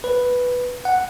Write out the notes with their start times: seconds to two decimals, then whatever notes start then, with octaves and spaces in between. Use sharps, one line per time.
0.04 B4
0.85 F#5